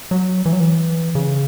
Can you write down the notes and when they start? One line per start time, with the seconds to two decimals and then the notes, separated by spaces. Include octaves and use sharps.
0.11 F#3
0.46 E3
0.53 F#3
0.60 E3
1.15 C#3